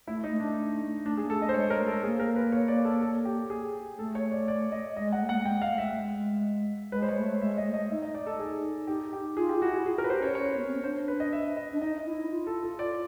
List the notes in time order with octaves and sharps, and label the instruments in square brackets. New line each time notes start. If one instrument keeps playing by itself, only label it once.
[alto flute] A3 [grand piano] E4
[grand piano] D#4
[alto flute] A3
[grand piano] D4
[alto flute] A3 [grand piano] D4
[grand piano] G#4
[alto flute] A#3
[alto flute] A3 [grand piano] A4
[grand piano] D#5
C5
[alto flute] G#3 [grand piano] C#5
[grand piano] A#4
[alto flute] A3
[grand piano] A4
[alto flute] A#3 [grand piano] G#4
[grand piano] A#4
B4
C#5
D5
A4
A4
G4
G#4
[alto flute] A3 [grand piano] A4
[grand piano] C#5
D5
D5
D#5
[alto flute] G#3 [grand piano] D#5
[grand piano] F#5
[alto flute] A3
[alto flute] A#3 [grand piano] F#5
[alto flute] A3
[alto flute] G#3 [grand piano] G5
[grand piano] F5
[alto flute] A3
[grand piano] E5
[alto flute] G#3
[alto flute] G#3 [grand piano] B4
[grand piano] C5
C#5
[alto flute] A3
[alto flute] G#3 [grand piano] E5
[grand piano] D#5
[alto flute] A3
[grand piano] D#5
[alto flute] D#4 [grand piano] E5
[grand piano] D#5
D5
A4
G#4
[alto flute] D#4 [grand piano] G4
[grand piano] G4
[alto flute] F4 [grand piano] G#4
[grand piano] G4
[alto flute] E4 [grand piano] F#4
[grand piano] G#4
[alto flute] F4 [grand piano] G#4
[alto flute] F#4 [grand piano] A#4
[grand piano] B4
[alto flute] G4 [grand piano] C5
[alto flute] C#4 [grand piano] C#5
[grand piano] C#5
[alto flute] B3
C4
C#4
[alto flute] D4 [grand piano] C5
[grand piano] B4
D#5
E5
D#5
[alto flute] D4
[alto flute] D#4 [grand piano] D#5
[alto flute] E4
F4
[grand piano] A4
A4
D5